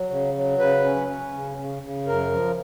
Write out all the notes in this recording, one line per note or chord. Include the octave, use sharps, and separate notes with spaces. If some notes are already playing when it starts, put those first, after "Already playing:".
Already playing: F#3
C#3
F#3
C#3 B4
C#4
C#4
C#3
C#3
C#3
F#2 A#4
F3